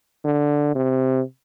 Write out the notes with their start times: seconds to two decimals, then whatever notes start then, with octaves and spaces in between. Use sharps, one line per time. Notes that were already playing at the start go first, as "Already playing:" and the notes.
0.25 D3
0.76 C3